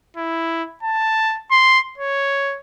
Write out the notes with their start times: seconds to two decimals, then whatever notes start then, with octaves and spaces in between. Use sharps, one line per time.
0.17 E4
0.83 A5
1.51 C6
1.98 C#5